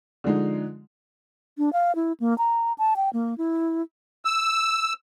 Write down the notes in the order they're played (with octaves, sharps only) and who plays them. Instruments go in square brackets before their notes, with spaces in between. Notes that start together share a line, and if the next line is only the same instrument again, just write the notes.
[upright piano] D3 F3 G#3 D#4
[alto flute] D4
F5
E4
A#3
A#5
A5
G5
A#3
E4
[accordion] E6